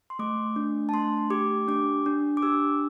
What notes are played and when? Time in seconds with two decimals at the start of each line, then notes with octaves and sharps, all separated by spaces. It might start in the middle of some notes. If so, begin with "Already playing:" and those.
0.10 C6
0.19 A3 D6
0.56 D4
0.89 A5
0.93 A3 C6
1.30 G4 D6
1.68 D4 D6
2.06 D4
2.37 D6
2.42 G4 E6